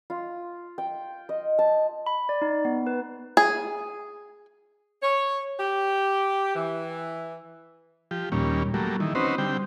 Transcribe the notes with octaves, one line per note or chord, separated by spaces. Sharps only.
F4
G5
D#5
A5
B5
D5
D#4
B3
B4
G#4
C#5
G4
E3
F3 G4
D#2 A#2 G3 C#4
F#3 G3 A3 A#3
D#3 E3
C4 C#4 D#4 F#4 B4 C5
D3 G3 C4 G5